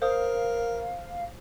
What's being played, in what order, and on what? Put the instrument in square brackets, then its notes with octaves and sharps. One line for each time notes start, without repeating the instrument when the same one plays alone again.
[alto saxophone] A#4 [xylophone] C5 D#6 [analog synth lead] F5